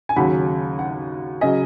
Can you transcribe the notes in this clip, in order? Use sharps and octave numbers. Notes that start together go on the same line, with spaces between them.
G#5
D#2 C#3 F#3 F#5 B5
F#5
C#3 F#3 D#5 G#5